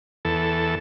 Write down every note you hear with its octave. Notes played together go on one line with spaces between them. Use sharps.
E2 A4